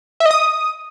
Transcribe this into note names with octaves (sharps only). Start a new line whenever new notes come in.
E5
D#5
D#6